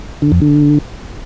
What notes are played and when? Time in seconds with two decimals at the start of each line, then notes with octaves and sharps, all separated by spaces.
0.22 D3
0.32 F2
0.41 D3